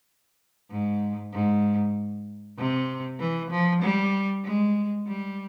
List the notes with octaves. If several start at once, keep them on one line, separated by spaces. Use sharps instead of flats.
G#2
G#2
C3
E3
F3
G3
G#3
G3